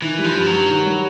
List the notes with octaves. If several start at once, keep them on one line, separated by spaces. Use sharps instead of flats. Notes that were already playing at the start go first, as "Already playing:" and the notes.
D#3 E3
G3
F3
G2
F#3
G2
D#3
G3